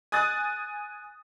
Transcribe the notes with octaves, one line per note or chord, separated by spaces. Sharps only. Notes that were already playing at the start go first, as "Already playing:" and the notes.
G#5 D#6 F#6 A6